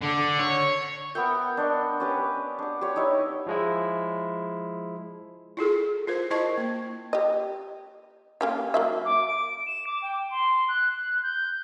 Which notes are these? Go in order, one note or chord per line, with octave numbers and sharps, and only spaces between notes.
D3
C#5
B3 A#4 E5 G5
D4 D#5 C#6
C#4 G4 B4
D4 F#5
G4 C#5
D#4 E4 C#5 D#5
F3 G#3 E4
E4 F4 G#4 A4
F4 A#4 C5
E4 F4 C5 D#5 A5 C#6
A#3
G4 D#5
A#3 C#4 G4
F#3 A#3 E5
D6
D7
E7
D6
G5
C6
F#6
G6